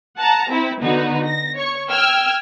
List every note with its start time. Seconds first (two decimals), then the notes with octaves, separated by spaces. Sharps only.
0.18 F#5 A5 A#5
0.50 C4 E4
0.82 D3 B3 D#4 F#4
1.23 A#6
1.55 C#5 C#6
1.90 G5 E6 F6 G#6